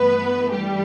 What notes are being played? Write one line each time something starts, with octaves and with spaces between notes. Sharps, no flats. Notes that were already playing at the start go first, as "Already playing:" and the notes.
Already playing: G2 E3 A3 B3 B4
G3 G4